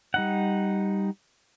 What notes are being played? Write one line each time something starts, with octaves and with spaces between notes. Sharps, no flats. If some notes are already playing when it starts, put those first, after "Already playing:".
G3 D#4 F#5